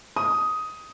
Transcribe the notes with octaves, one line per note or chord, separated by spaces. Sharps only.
D#6